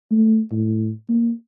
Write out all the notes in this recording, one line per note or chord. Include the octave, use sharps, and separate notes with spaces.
A3
A2
A#3